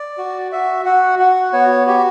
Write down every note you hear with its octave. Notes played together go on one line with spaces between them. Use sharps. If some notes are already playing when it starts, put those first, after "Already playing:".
Already playing: D5
F#4
F#4 E5
F#4 F#5
F#4 F#5
B3 C#5
F#4 G4